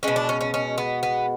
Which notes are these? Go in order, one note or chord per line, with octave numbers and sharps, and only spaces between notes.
B2 G#3 C#4
D4
C#4
C#4
C#4
B3
B3